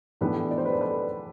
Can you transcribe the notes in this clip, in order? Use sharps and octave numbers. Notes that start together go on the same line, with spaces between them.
A2 E3 B3 D4 G4 B4
D5
C5
B4
A4 C5
B4 D5